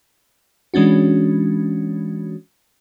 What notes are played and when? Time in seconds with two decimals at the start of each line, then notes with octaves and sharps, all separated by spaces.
0.74 E3 G#3 C#4 D4 F#4